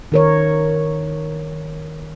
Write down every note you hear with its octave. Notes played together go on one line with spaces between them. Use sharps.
D#3 A#4 C#5